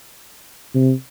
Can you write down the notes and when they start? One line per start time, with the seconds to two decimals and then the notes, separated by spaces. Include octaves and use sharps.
0.74 C3